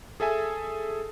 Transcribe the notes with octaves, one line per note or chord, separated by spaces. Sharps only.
G#4 A4 E5 G#5